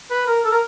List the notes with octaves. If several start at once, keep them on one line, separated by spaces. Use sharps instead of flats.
B4
A#4
A4
A#4